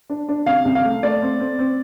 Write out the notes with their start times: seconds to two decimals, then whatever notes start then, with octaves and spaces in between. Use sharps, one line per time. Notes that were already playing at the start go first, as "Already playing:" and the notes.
0.10 D4
0.29 D4
0.46 C3 F5
0.65 C2
0.75 F5
0.84 A3
1.03 A3 D5
1.22 C4
1.40 C4
1.59 C4